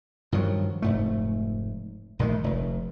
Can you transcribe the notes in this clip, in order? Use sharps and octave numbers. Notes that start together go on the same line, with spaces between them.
G2 D#3 F3 F#3
F1 G#2 A3
A#1 D#3 G#3 A3
F1